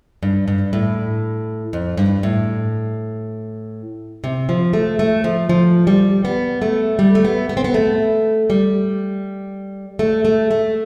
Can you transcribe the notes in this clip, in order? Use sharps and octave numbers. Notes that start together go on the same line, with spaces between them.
G2
G2
A2
F2
G2
A2
C3
F3
A3
A3
F3
F3
G3
B3
A3
G3
A3
B3
B3
C4
B3
A3
G3
A3
A3
A3